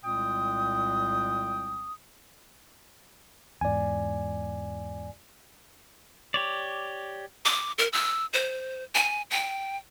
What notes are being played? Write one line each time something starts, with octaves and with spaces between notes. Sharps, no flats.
C2 A#2 G#3 C4 G5 D#6
E2 G#2 D5 G#5
G4 C#5 D5
D6
A#4
E6
C5
G#5
G5